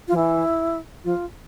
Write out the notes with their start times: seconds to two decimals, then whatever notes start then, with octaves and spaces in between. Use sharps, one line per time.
0.08 F4
0.12 F3
0.16 E3 E4
1.04 F3 F4